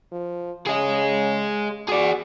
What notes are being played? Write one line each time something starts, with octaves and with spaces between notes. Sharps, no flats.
F3
C#3 G#4 D#5
F#4 G#4 D5